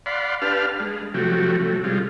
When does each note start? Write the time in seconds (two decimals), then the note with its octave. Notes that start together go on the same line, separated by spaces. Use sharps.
0.06 D5 F5 F#5 B5 C6
0.42 D4 G4 B4 F5 A5 F6
0.80 G#3
1.14 C3 F3 F#3 A3 F#4 G4
1.60 C3 F#3 A3
1.84 C3 G3 G#3 F4